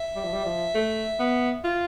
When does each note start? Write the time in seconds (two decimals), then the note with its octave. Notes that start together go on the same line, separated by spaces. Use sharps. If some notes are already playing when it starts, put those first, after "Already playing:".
Already playing: E5
0.15 G3
0.24 F3
0.33 G3
0.45 F3
0.75 A3
1.19 B3
1.64 F4